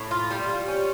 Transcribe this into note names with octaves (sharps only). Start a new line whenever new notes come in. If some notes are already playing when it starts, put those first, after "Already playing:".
Already playing: A2
F4
G3
G3
C#4